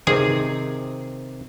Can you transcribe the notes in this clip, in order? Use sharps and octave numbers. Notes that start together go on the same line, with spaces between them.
C3 D#3 C4 G#4